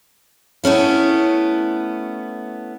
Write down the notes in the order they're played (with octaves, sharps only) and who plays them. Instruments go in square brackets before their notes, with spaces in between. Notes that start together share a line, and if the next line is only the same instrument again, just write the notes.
[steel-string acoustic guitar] A3 B3 C#4 E4